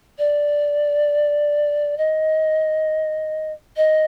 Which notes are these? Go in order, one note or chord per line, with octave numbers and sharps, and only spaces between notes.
D5
D#5
D#5